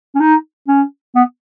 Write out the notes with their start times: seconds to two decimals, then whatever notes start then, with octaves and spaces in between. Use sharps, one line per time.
0.15 C#4
0.20 D#4
0.68 C#4
1.16 B3